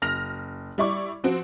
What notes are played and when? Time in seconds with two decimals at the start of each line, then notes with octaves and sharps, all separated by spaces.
0.02 F#1 F6 A#6 F7
0.78 G3 E4 D5 C#6
1.24 F3 C4 F#4